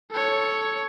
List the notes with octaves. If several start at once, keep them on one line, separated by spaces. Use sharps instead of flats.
A4 C#5